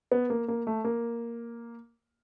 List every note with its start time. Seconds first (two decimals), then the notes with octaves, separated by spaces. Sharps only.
0.12 B3
0.30 A#3
0.48 A#3
0.67 A3
0.85 A#3